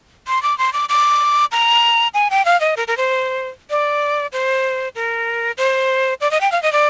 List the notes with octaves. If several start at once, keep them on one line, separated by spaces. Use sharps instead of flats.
C6
D6
C6
D6
D6
A#5
G#5
G5
F5
D#5
A#4
A#4
C5
D5
C5
A#4
C5
D5
D#5
G5
F5
D#5
D5